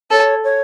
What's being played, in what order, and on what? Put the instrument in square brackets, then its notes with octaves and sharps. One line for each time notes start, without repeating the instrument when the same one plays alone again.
[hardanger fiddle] A4 [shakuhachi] C#5
[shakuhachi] C#5